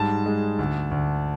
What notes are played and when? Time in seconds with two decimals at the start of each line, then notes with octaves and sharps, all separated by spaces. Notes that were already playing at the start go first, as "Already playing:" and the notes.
Already playing: G#2 G3 A5
0.26 G#3
0.59 D2
0.91 D2